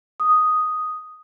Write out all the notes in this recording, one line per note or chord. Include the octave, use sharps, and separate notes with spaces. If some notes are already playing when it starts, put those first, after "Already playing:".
D#6